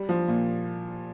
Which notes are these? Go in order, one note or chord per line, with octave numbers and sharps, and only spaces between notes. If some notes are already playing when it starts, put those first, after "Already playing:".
Already playing: G3
F3
A#2